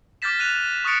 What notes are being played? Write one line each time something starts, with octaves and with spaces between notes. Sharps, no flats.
D6 F6 G6 A6 B6 E7
F#6 D#7 F7
C#6 D#6 F#6 A6 C#7 D7